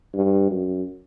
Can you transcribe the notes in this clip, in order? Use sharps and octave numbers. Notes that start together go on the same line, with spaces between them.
G2
F#2